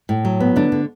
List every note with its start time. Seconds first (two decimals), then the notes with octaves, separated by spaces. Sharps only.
0.09 A2
0.25 F#3
0.40 B3
0.56 D3 D4
0.72 D3